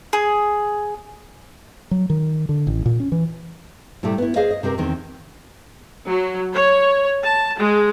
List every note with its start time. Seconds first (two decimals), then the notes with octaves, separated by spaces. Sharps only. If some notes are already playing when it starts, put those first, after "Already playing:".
0.13 G#4
1.91 F#3
2.10 D#3
2.49 D3
2.67 A1
2.86 A#2
3.00 C#4
3.12 E3
4.03 A2 C3 G3 A3
4.18 B3 E4
4.36 G#4 C5 D#5 F5
4.51 D#5
4.63 C3 C4 G4 A#4
4.78 E2 D#3 C4
6.09 F#3
6.53 C#5
7.23 A5
7.59 G#3